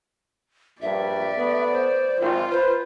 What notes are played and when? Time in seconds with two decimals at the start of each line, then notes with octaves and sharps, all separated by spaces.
0.82 A#1 G2 D5 E5
1.36 A3 B3
1.72 C5
2.20 G#1 F4
2.52 B4 C5